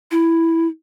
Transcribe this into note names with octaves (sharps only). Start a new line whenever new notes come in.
E4